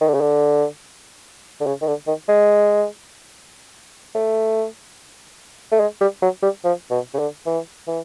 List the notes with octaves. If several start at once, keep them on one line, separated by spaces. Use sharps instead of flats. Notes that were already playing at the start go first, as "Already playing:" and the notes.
D#3
D3
C#3
D3
D3
C#3
D#3
D3
D#3
G#3
A3
A3
G#3
G3
F#3
G3
F3
B2
C#3
D3
E3
E3